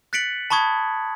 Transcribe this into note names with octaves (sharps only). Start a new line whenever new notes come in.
F#6 A6 B6 C#7 D7 F#7
A5 B5 C#6 D#6 G#6